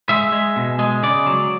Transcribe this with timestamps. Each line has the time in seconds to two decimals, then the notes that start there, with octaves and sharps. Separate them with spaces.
0.09 G#3 E5
0.32 G#3
0.56 B2
0.79 G#3
1.03 C#3 D5
1.27 F#3